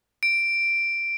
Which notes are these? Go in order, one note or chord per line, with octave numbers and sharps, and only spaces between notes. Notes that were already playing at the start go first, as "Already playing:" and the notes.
D7